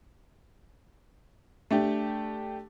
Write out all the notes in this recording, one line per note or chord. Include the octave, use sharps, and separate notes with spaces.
A3 D4 G4